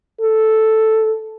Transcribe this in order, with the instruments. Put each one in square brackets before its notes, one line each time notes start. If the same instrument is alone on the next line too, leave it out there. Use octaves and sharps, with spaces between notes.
[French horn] A4